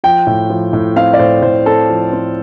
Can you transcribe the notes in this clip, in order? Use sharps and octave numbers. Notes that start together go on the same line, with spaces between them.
F3 G5
A2
F3
A2
C4 F5
D5
A2 C5
A2 C5
C4 A4
F3
C4